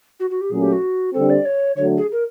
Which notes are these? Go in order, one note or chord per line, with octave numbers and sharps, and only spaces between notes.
F#4
F#4
G4
A#2 F#3 A3 C#4 G#4
G4
F#4
D3 G3 C4 A4
D5
C#5
D3 F#3 A3 C#5
G#4
A#4